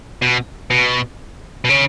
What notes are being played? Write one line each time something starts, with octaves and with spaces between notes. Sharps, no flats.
B2
B2
B2
C#3